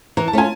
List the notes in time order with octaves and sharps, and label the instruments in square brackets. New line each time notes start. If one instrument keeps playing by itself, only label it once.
[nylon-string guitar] E3 [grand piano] A#5
[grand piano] A5
[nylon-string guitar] A3 C#4 F4 [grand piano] G#5